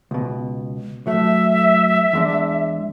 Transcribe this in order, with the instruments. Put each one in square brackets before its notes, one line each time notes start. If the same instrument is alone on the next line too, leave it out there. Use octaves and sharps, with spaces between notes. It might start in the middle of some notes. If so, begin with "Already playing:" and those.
[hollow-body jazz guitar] C#2 B2
[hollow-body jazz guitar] F#3 A3 [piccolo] E5
[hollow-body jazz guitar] E2 G#3 D4